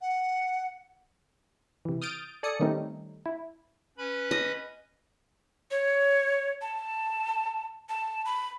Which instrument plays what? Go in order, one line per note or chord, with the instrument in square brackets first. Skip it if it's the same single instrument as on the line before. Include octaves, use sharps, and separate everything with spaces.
[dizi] F#5
[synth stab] C3 E3
D#6 F6 G6 A6 D7
A4 D5 G#5 D#6 C#7
D#3 G3 A3 C4 C#4 D#4
E4
[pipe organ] C#4 B4 B5
[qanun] D#5
[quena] C#5
A5
A5
B5